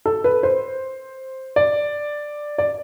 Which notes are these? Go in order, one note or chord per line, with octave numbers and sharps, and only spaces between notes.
A4
B4
C5
D5
D5